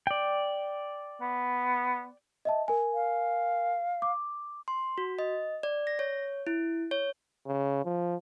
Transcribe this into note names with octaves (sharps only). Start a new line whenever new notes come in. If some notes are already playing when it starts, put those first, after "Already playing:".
D5 G5
B3
D#5 E5 A5
A#4 G#5
F5
D6
C6
F#4
D#5
D5
A#6
C#5
E4
C#5
C#3
F3